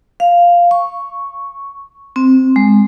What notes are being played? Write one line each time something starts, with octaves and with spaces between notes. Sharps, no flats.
F5
C#6
C4
G#3